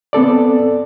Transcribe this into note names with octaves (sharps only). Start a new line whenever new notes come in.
B3 C4 A4 D5